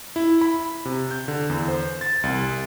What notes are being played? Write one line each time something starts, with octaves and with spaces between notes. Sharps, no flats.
E4
B5
C3
G6
D3
E2
C5
A6
C2